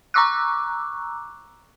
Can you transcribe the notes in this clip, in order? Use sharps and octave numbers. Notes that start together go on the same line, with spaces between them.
A#5 C#6 D6 E6 F#6